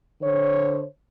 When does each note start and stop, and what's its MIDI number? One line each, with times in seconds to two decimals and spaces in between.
0.22 0.84 50
0.22 0.84 72
0.22 0.84 73